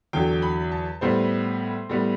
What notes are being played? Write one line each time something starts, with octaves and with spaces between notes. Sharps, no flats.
E2 D3 F#3 G5
B5
A5
A2 G3 B3 C5
A2 G3 B3